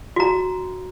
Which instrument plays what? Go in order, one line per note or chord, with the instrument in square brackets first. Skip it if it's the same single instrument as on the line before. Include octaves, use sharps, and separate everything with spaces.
[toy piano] F#4 A#5